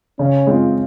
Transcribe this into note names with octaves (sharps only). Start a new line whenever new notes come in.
C#3 C#4
G#3 C4 F4